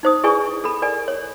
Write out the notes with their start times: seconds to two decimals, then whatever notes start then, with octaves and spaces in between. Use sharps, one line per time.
0.03 D#4 C5 D#6
0.24 E4 G#4 B4 D5 G#5 C#6
0.64 A4 B5
0.82 A#4 D5 G#5
1.08 C#5